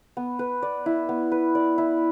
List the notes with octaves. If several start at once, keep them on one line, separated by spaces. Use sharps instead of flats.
B3
B4
D5
E4
B3
B4
D5
E4